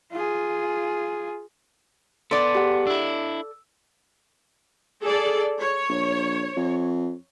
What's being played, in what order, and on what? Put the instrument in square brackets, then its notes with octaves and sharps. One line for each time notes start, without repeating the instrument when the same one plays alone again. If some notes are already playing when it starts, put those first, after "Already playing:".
[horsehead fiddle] F4 G#4
[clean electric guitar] B3 [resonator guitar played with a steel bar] A4 D5 [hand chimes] C6
[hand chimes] G4 G#4 F#5
[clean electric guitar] D4 E4 [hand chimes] E6
[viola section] G#4 A4 D5
C#5
[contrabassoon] A#1
F2